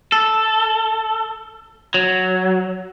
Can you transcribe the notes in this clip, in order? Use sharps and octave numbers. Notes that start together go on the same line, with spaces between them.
A4
F#3